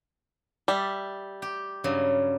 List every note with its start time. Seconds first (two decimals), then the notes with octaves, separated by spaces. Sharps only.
0.68 G3 E5 A5
1.42 G4
1.84 G2 C#3 F#3